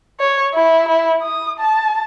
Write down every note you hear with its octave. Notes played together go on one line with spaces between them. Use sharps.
C#5
E4
E4
D#6
A5